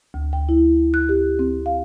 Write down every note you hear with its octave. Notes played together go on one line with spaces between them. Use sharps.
D2
G5
E4
F#6
G4
C4
F5